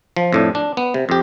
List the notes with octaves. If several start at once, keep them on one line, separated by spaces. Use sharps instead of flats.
F3
F2 A2 D4
D4
B3
C3
F2 G4